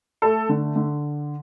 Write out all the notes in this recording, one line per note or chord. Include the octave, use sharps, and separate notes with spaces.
A3 A4
D3
D3